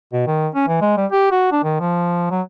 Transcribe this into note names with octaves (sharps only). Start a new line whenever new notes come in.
B2
D#3
C#4
E3
G#3
G3
G4
F#4
D4
D#3
F3
F#3